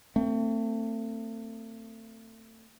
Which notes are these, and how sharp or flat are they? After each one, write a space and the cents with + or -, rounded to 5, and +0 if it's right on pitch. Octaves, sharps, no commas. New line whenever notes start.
A3 +35 C4 +0